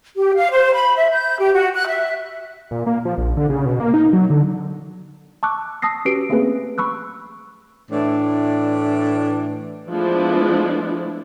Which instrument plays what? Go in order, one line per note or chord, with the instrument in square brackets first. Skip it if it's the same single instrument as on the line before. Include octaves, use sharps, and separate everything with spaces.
[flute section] G4
F5
C5
B5
E5
G6
G4
F#4
F#6
E5
[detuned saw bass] A#2
A#3
F3
A#1
D3
C#3
B2
A#3
D#4
F#3
D3
[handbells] A5 C#6 D6 E6 F#6
A5 D#6 E6 A#6 C7
C#4 F#4 G4 B4 C7 D7
A3 A#3 C4 C#4 G#4 B4
B5 C#6 E6 F#6
[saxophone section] A2 E3 D4
[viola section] F3 G#3 A3 B3 D4 E4